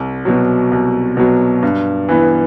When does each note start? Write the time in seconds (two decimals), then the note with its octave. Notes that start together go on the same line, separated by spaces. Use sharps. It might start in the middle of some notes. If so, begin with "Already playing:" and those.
Already playing: C2
0.25 B2 F#3
0.71 C2
1.17 B2 F#3
1.62 G2
2.09 E3 B3